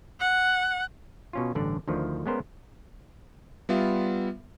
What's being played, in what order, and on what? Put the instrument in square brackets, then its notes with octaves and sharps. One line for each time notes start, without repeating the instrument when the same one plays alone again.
[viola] F#5
[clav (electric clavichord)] B2 C#4 F4
A1 G2 D3 D5 A5
D2 D3 D#3 F3
G#3 A3 B3 C#4 A#4 C5
[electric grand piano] G3 B3 F4 E5